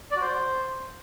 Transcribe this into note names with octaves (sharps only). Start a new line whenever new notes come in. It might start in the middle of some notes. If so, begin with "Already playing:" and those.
D5
F#4
C5